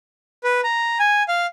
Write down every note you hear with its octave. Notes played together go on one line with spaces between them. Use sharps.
B4
A#5
G#5
F5